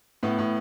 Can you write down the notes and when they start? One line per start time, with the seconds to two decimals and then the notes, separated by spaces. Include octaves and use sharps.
0.23 A2 B3
0.39 A2